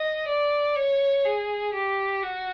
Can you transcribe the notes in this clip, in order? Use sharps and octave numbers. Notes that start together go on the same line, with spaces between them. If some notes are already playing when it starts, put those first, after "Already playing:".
Already playing: D#5
D5
C#5
G#4
G4
F#4